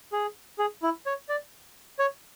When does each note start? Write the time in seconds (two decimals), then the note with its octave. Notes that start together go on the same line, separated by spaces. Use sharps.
0.12 G#4
0.59 G#4
0.83 E4
1.06 C#5
1.29 D5
1.99 C#5